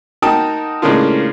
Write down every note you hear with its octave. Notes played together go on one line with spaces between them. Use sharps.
D#4 F#4 A#4 G5 A5 D#6
A2 C#3 G#3 A#3 D4 F4